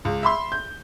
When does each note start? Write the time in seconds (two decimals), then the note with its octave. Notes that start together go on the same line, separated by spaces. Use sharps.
0.05 C#2
0.23 E5 B5 C6
0.52 G6